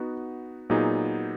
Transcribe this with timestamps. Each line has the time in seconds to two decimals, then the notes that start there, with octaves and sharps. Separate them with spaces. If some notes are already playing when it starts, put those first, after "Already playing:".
Already playing: B3 D#4 F#4
0.70 A#2 F#3 B3 D#4 G#4